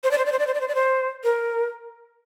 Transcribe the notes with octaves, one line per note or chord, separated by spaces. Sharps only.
C5
D5
C5
D5
C5
D5
C5
D5
C5
D5
C5
A#4